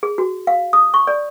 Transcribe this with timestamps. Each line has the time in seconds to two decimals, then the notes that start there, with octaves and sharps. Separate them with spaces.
0.03 G#4
0.18 F#4
0.47 F5
0.73 D#6
0.94 C#6
1.07 D5